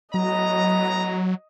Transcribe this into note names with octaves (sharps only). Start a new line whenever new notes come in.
A2 F#3 B3 D#5 A#5